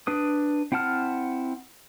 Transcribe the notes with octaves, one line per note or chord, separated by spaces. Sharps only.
D4 B4 D#6
C4 E4 F#5 A5 F6